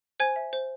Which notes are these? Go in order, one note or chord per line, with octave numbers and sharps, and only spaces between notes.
C5 G#5 G#6
E5
C5